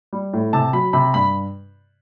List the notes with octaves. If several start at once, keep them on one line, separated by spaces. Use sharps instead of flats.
G3
A2
C3 A5
F#3 B5
C3 B5
G2 B5